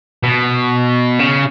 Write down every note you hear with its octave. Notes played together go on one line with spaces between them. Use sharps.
B2
C#3